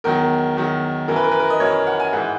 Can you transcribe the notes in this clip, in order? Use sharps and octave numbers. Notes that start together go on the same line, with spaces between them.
E2 D#3 F#3 A#4
E2 D#3 F#3
F#2 E3 A#4
B4
A#4
B4
A#4
D#5
F#2 E3 C#5
F#5
G#5
G#2 E3 F#5